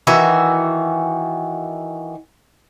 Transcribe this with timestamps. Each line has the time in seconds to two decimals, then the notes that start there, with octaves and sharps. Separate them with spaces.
0.07 D#3 E3 F#4 E5